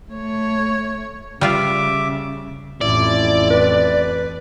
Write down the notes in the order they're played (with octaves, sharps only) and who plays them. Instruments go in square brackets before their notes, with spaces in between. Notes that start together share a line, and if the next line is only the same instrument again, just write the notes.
[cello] A3 C#5
[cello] C#3 [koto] G3 F4 B4 [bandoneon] E5 D6
[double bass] A1 F2 [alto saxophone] E4 [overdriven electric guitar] D5
[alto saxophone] B4